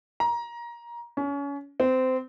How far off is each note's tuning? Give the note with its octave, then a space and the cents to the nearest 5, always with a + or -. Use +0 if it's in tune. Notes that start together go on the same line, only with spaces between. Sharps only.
A#5 +20
C#4 +30
C4 -20